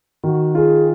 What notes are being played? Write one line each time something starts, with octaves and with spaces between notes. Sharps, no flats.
D#3 F#4
F4 G#4